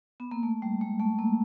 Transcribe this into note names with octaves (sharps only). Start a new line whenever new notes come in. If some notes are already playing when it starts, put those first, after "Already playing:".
B3
A#3
A3
G3
G#3
A3
A#3